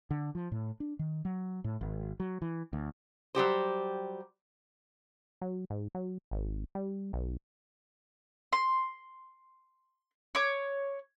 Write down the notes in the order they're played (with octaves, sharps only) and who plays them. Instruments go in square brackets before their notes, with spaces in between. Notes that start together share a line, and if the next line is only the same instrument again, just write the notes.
[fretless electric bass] D3
F3
A2
D4
D#3
F#3
A2
G#1
F#3
E3
D2
[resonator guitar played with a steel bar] F#3 G3 G4 C5
[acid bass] F#3
G#2
F#3
G#1
G3
B1
[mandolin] C6
C#5 D6